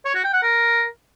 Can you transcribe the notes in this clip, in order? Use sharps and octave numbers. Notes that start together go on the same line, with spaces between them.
C#5
F#4
G5
F#5
A#4